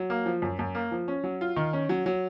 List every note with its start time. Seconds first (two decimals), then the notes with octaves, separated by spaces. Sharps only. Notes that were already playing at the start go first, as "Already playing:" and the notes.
Already playing: F#3
0.10 A#3
0.26 F3
0.42 F#2
0.59 F#2
0.75 A#3
0.91 F3
1.08 C#4
1.24 F#3
1.41 F4
1.56 D#3
1.73 C#4
1.89 F#3
2.06 F#3